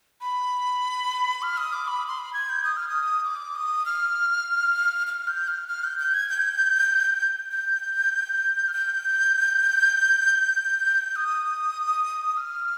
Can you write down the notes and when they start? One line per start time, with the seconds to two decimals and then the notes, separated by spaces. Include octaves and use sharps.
0.21 B5
1.42 F6
1.57 D#6
1.73 D6
1.88 B5
2.08 C6
2.18 B5
2.33 G#6
2.49 G6
2.64 D#6
2.77 F6
2.89 D#6
3.24 D6
3.56 D#6
3.86 F6
5.07 F6
5.27 G6
5.48 F6
5.68 F6
5.84 G6
5.99 G6
6.14 G#6
6.29 G6
7.51 G6
8.68 F6
8.73 G6
11.16 D#6
12.37 F6